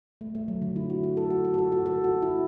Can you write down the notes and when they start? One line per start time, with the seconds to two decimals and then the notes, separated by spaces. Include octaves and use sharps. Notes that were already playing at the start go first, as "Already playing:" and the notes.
0.21 A3
0.35 A3
0.48 F#3
0.62 D3
0.76 E4
0.90 F#4
1.03 F#4
1.17 A4
1.30 F#4
1.45 F#4
1.54 A4
1.58 F#4
1.72 F#4
1.86 A4
2.04 F#4
2.22 E4